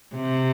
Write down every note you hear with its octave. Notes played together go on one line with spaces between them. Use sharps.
C3